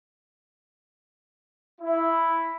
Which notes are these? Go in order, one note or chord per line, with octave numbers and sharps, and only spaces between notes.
E4